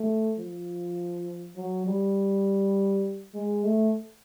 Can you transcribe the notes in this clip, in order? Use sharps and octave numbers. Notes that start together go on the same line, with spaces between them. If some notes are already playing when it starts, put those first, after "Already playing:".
Already playing: A3
F3
F#3
G3
G#3
A3